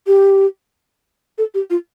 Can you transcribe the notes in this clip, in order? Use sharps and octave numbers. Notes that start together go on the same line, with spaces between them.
G4
A4
G4
F4